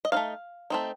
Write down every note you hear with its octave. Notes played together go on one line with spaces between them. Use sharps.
D#5
A3 C4 D#4 F5
A3 C4 D#4